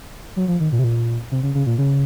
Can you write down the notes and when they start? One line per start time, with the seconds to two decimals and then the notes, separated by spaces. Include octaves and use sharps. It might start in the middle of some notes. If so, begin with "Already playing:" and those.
0.36 F#3
0.48 F3
0.60 D#3
0.72 A#2
0.79 C3
0.84 A#2
1.31 C3
1.43 C#3
1.55 C#3
1.66 A#2
1.78 C#3